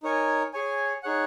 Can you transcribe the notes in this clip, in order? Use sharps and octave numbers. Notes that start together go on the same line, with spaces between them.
D#4 A#4 C#5 G#5
G#4 C#5 G#5
D#4 G#4 C#5 F#5